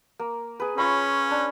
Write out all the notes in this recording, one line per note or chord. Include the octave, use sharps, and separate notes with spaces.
A#3
G#4 B4
C#4 F4 C#5 B5
D4